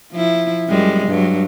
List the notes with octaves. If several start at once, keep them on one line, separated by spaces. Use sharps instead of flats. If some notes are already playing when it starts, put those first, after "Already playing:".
F3 E4
F#2 G3 G#3
G2 F#3